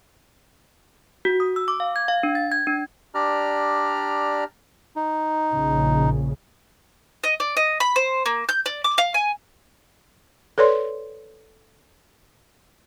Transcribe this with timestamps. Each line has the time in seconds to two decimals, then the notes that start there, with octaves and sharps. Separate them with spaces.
1.25 F#4
1.40 D#6
1.56 E6
1.68 D6
1.80 F5
1.96 G#6
2.08 F5
2.23 D4
2.35 A6
2.52 G#6
2.67 D4
3.15 D4 G4 D5 A#5 F6
4.96 D#4
5.51 A#1 C#3
7.24 D#5
7.40 D5
7.57 D#5
7.80 B5
7.96 C5
8.26 A#3
8.49 G6
8.66 D5
8.84 D6
8.98 F5
9.14 G#5
10.58 A4 B4 C#5 D5 C6